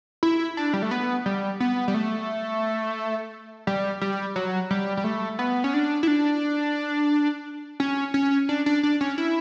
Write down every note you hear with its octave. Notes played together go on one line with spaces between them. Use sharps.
E4
D4
G3
A3
B3
G3
B3
G3
A3
G3
G3
F#3
G3
G3
A3
B3
C#4
D4
E4
D4
C#4
C#4
D4
D4
D4
C#4
E4